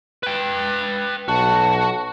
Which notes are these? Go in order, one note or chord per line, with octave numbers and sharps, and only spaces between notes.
B4 G5
B1 F#4 A5